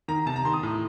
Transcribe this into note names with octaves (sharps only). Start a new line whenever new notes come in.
D#3 A#5
C3 A5
A#5
D#3 C6
D#6
A2